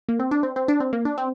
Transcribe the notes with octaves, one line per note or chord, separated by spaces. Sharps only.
A#3
C4
D4
C4
C4
D4
C4
A#3
D4
C4